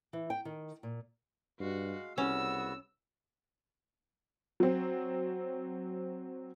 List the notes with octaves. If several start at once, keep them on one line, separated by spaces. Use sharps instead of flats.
E3
G5
D#3
A#2
G2 G#3 F#4 F5
C2 C#3 B3 C#4 F#4 E6
F#3 C4